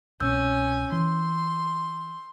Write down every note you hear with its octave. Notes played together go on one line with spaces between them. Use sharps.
C2 B2 C4 C#4 G#5 E6 G6
E3 C6